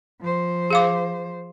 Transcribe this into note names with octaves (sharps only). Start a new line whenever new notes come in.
F3 C5
G#4 F5 D6